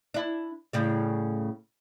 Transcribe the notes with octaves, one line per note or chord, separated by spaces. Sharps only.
D4 E4
A2 C#3 G3